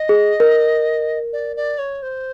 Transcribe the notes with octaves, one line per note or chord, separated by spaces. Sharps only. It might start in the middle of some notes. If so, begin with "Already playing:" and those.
Already playing: D#5
G#4
A#4
D5
D5
C#5
C5